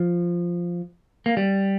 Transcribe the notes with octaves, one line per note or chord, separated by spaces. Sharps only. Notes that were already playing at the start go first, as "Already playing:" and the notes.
Already playing: F3
A#3
G3